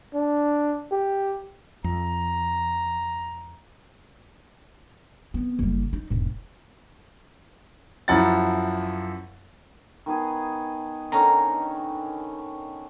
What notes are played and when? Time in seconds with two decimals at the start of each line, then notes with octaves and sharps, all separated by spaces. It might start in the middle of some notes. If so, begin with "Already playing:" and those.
0.14 D4
0.92 G4
1.84 F2 A#5
5.34 B3 C4
5.59 F#1 G3
5.93 D#4
6.10 E1 G#2
8.08 F#2 F3 E4 F#5 A#5 A6
10.06 D#3 B3 G#4
11.12 D3 D#3 C#4 D#4 A#5